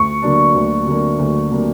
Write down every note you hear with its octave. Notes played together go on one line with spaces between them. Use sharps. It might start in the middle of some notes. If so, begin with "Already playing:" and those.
Already playing: D2 C#6
D3 F#3 A#3 D4
D2
D3 F#3 A#3 D4
D2
D3 F#3 A#3 D4